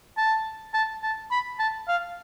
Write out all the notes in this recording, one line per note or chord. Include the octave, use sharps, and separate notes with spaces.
A5
A5
A5
B5
A5
F5